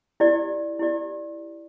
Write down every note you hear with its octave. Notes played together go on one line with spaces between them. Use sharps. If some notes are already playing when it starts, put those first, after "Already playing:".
E4 G4 D5
E4 G4 D5